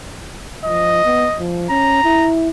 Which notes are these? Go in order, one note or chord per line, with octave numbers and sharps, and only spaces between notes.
F3 D#5
B3
F3
C#4 A#5
E4